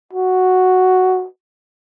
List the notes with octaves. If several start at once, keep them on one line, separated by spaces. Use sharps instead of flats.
F#4